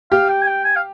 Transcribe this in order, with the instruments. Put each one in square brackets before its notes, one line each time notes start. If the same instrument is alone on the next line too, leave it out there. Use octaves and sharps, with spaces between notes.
[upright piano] G4 [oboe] F5
[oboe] G5
G#5
G5
G#5
F5